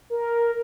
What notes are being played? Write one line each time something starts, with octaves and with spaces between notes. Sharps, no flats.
A#4